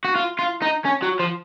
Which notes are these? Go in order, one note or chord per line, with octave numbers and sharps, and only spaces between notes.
F#4
F4
F4
D#4
C#4
F#3
F3